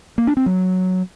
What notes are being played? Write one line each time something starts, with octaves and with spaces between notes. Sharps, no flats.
A#3
D4
C4
F#3